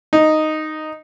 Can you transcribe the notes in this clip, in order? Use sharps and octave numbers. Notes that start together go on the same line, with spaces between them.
D#4